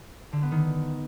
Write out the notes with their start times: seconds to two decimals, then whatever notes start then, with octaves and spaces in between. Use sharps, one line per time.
0.33 D3
0.42 B3
0.51 D#3